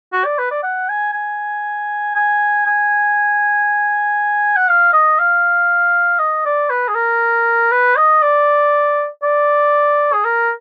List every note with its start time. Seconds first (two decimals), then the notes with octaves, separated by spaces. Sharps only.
0.13 F#4
0.25 D5
0.38 B4
0.51 D5
0.63 F#5
0.89 G#5
1.13 G#5
2.15 G#5
2.66 G#5
4.56 F#5
4.68 F5
4.93 D#5
5.19 F5
6.19 D#5
6.45 D5
6.70 B4
6.88 G#4
6.95 A#4
7.72 B4
7.96 D#5
8.22 D5
9.23 D5
10.13 G#4
10.25 A#4